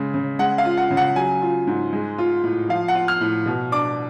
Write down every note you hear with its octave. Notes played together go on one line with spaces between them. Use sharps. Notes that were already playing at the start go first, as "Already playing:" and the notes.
Already playing: C#3 G#3
C#3
G#3 F#5
F5
F4
F#5
C#3
F#5
F#3 G#5
F4
G#2
G#3
F4
A2
F3 F5
F#5
F4
F6
A2
B2
D4 D6